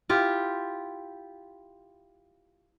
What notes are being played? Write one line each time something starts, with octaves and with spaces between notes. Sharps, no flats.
E4 F4 G4